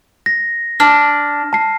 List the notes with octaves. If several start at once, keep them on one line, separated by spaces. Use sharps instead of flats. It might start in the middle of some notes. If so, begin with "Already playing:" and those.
A#6
D4 F6
A5 C7